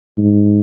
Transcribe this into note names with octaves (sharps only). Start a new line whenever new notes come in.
G#2